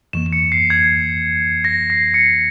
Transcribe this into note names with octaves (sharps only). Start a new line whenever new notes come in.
F2 E3 A#3 E7
E7
C#7
C7
G#6
A#6
C7
C#7